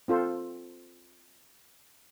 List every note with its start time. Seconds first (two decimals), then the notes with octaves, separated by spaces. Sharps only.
0.08 C4 F4 A4 C5